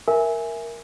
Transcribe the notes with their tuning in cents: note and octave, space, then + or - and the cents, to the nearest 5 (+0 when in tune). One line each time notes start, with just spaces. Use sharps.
A#4 +0 E5 +0 G#5 +0